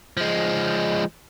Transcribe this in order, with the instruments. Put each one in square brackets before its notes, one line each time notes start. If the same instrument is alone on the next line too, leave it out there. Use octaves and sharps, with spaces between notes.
[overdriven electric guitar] F3 G#3